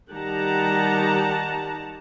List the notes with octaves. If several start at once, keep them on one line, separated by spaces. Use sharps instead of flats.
D#3 G3 G4 F#5 A5 A#5